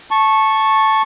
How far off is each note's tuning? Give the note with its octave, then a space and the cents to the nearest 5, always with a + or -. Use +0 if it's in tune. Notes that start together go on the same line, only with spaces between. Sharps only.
A5 -5 C#6 -10